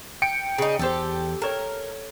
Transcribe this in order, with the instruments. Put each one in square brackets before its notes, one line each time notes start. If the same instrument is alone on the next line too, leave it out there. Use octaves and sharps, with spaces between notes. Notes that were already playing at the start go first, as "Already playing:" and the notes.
[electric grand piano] G5 C#7 D7
[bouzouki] C#3 D#4
[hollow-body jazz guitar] E2 C5 [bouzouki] G4 A4
[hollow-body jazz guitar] A4 C#5 [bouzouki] A#4